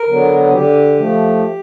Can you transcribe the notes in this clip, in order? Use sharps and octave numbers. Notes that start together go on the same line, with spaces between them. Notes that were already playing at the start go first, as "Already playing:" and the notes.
Already playing: A#4
D3 F#3 B3
D3 G4
F3 A3